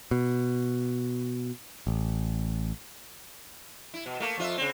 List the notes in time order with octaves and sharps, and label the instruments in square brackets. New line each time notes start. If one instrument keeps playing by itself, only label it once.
[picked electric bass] B2
A1
[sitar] E4
B2
A3 A#3
F2 F4 E5
C#3 C4